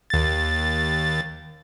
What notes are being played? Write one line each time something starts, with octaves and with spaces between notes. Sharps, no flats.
D#2 A6